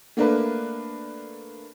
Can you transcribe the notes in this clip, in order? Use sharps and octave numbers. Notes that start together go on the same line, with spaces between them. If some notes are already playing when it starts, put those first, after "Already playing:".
A3 A#3 D4 A#4 B4